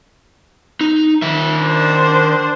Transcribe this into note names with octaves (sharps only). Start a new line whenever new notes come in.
D#4
D#3 E5
D4 C5